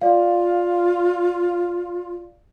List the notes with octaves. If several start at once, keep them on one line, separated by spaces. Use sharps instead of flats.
F4 D5 F5